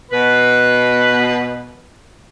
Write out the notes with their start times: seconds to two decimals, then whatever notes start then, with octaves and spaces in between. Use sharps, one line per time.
0.12 B2 B4